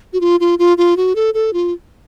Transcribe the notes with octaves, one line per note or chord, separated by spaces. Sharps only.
F#4
F4
F4
F4
F4
F#4
A4
A4
F4